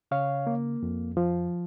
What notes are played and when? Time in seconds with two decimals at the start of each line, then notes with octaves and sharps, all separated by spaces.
0.11 C#3 C#5 F5
0.47 A#3
0.83 F2
1.17 F3